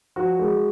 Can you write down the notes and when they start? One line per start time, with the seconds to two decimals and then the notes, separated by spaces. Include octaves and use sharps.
0.16 F3 F#4
0.39 G#3